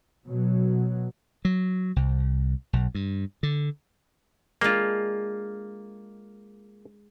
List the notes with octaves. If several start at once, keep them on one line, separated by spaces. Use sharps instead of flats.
B2 F#3
F#3
C2
B1
G2
D3
G#3 A#3 D4 F4